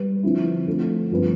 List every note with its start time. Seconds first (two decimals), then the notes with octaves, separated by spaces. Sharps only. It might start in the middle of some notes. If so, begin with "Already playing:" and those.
Already playing: G3 B4
0.23 D3 F3 C4 E4
0.66 D3 F3 A3
1.11 G2 F3 C4 F4 B4